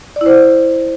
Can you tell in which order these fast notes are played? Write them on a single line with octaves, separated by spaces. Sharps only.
D5 E4 C5